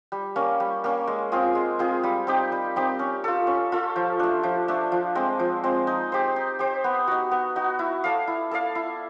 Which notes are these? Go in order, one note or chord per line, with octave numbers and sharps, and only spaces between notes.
G3
A#3 C#4
G3
A#3 C#4
G#3
C4 F4 G#4
G#3
C4 F4 G#4
G3
C4 D#4 G4
G3
C4 D#4 G4
C#4
F4 A4
C#4
F4 A4
F3
A3 D4
F3
A3 D4
F3
G#3 C4
F3
G#3 C4
D#4
G4 C5
D#4
G4 C5
B3
D#4 F#4
B3
D#4 F#4
E4
A4 D5 F5
E4
A4 D5 F5
E4